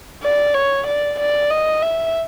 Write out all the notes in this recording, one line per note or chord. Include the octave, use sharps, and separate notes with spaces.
D5
C#5
D5
D5
D#5
E5